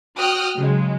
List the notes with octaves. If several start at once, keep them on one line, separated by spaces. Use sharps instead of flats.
F#4 G5 D#6 F6 F#6
C#3 F#3 G#3